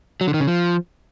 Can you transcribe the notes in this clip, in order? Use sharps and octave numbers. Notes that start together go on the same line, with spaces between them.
F#3
D3
D#3
C#3
F3